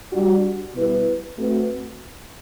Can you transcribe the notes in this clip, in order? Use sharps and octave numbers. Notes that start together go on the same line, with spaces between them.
G3 D4 F#4
B2 G3 B3 E4 B4
A3 C4 F#4 B4